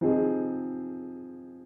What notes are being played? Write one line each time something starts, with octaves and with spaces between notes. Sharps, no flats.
C3 F3 C4 D#4 G#4